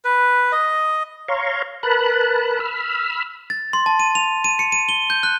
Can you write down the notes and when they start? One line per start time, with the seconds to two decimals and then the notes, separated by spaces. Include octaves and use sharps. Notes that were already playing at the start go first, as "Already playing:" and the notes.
0.05 B4
0.52 D#5
1.28 C#5 F5 A#5 C6 C#6
1.83 A#4 B4 A5 B5 F#6
2.60 B5 E6 F6
3.50 A6
3.73 C6
3.86 A5
4.00 D#7
4.15 F7
4.44 D#7
4.59 C#7
4.72 D#7
4.89 G7
5.10 G6
5.23 F#6